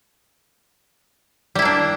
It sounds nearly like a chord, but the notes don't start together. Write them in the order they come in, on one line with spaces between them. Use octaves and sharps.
G3 E4 A#3 D4